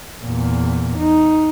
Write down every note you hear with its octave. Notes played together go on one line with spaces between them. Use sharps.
E2 A#2
D#4